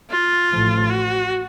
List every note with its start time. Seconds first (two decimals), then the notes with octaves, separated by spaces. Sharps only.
0.10 F4
0.50 A1 A2 F3
0.89 F#4